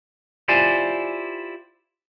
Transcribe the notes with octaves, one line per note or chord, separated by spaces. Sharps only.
E4 F4 G4 C5 D5 G#5